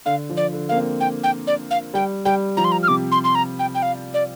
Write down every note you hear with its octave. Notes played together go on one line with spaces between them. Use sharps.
D3 F5
F3
D5
D3
A#3 F5
C4
G5
G5
D5
F5
G3 G5
G3 G5
F3 A#5
C6
A#5
F6
C3 D6
C6
C6
A#5
G5
G5
F5
D5